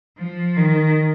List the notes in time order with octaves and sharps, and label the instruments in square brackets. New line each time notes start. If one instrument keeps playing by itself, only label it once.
[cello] F3
D#3